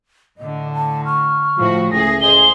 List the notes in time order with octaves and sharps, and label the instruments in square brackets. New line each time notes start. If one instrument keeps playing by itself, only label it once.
[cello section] A2 D3 [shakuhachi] D#5
[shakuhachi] A5
[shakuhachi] C#6 [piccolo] F6
[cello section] A2 F#4 [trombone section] F3
[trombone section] C#2 A2 A3 [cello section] G#4 [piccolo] A#6
[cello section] G#4 C5 [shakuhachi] D#5 [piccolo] G7